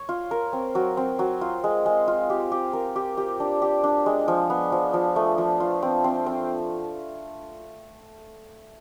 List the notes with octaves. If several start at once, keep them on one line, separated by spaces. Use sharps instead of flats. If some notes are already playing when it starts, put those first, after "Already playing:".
Already playing: C#5
F4
A#4
C4
F#3
C4
F#3
F4
G#3
G#3
F4
G4
G4
A#4
G4
G4
D4
G4
D4
G#3
F3
B3
F3
F3
A3
F3
F4
C4
C4
C4